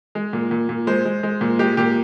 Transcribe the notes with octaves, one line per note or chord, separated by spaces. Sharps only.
G#3
A#2
A#2
A#2
G#3 C5
G#3
G#3
A#2
G#3 G4
A#2 G4